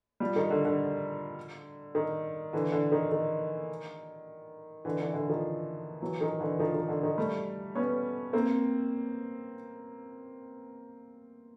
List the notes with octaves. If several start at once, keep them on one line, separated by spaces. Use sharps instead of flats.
F3 G3
D#3
D3
D3
D#3
D3 E3
D3
D#3
D#3
D3 E3
D3 E3
D3 E3
D#3 F3
E3 F#3
D#3
D3 E3
D#3 F3
D#3
D3
D#3
G3 A3
B3 C#4
A#3 C4